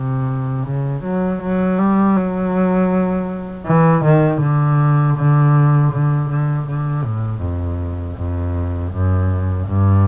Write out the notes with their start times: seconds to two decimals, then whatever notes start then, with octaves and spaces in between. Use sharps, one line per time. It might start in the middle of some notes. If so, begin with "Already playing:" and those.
Already playing: C3
0.67 C#3
1.04 F#3
1.42 F#3
1.79 G3
2.16 F#3
3.66 E3
4.04 D#3
4.42 D3
5.17 D3
5.92 D3
6.30 D3
6.67 D3
7.04 A2
7.42 F2
8.17 F2
8.92 F#2
9.67 G2